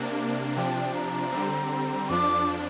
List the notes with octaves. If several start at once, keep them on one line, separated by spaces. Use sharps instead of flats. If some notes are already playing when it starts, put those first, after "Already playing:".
Already playing: C3 A#3 D4
C3 F3 D4 G5
A#5
D3 G3 C4
F2 F3 D4 D6